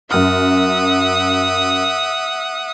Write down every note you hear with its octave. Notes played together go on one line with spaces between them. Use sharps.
F#2 E5 F#5 D#6 F6